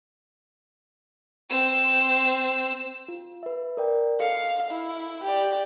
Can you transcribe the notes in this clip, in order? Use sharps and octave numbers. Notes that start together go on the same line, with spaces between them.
C4 E6
F4
B4 E5
A#4 D5 G5
A4 D#5 F5 C#7
E4
G4 D5